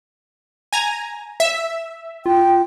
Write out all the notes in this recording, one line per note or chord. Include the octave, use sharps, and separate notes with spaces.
G#5 A#5
E5
F4 G5